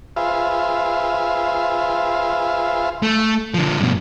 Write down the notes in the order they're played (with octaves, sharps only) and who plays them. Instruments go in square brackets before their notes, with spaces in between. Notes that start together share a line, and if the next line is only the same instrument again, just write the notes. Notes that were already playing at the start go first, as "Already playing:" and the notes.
[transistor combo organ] F4 G#4 B4 C5 E5 F5
[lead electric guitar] A3
D3 F3
G2 B2